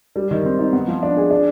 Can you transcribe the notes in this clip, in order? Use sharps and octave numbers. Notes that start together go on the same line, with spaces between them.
G3
D#3
C4
D#4
B3
F3
D4
G#4
D4